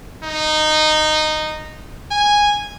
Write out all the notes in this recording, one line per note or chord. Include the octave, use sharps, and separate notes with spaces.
D#4
G#5